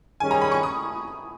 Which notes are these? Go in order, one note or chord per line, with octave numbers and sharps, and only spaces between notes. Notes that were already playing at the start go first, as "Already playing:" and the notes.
D#3 G3 C#4 G#4 G#5
A#5
B5
C#6
D#6